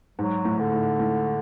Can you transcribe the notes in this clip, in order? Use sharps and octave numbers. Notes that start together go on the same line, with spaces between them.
G#2 F#3
A2
D3
A2
A2